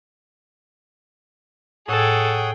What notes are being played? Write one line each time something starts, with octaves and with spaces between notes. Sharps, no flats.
A2 G#4 A4 C#5 F#5 G5 D#6